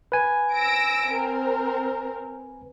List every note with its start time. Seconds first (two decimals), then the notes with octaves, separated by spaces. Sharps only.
0.12 B4 G#5
0.54 E6 A#6 D7
1.09 C4 A#4